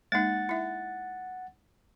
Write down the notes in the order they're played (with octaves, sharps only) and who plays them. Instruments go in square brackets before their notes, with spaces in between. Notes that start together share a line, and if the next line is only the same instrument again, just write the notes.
[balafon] G#3 A#3 D#4 [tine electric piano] F#5 A6
[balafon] E4 E5